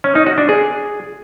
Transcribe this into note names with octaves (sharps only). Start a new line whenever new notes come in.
C#4
D#4
F#4
D4
G#4